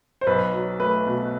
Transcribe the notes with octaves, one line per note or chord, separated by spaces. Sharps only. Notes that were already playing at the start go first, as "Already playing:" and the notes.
C5
B1 B4
F#3
A3 B4
B2